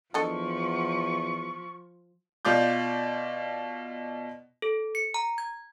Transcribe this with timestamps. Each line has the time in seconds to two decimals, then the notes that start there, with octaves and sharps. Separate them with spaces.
0.14 E2 F3 D4 A4 D#5 C#6
2.45 B2 F4 D5 G6
4.62 A4
4.95 C#7
5.14 A#5
5.38 G#6